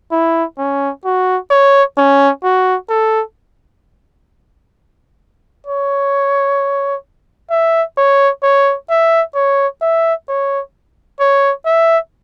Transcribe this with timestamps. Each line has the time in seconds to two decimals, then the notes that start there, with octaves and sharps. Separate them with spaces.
0.12 E4
0.58 C#4
1.05 F#4
1.51 C#5
1.98 C#4
2.44 F#4
2.89 A4
5.67 C#5
7.51 E5
7.98 C#5
8.43 C#5
8.90 E5
9.35 C#5
9.82 E5
10.28 C#5
11.20 C#5
11.66 E5